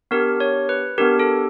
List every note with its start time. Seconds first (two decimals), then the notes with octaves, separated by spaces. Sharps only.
0.11 B3 D4 G4 A#4
0.40 C#5
0.69 B4
0.98 B3 D4 G4 A#4
1.19 A4